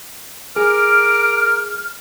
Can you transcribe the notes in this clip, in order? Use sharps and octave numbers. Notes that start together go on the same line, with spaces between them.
G#4 A#4 D6 F6